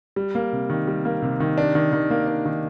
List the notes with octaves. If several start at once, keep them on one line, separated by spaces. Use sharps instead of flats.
G3
A#3
C3
D#3
G3
A#3
C3
D#3
D4
D#3
D#3
A#3
D4
D#3